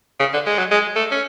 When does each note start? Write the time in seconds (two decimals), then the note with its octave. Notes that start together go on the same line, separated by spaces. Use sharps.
0.20 C#3
0.33 D3
0.47 G#3
0.59 F#3
0.71 G#3
0.96 A3
1.11 C#4